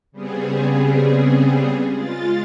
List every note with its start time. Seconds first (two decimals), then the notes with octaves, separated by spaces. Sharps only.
0.12 C#3 G3 B3 C4 G#4
1.91 G#3 F4 A6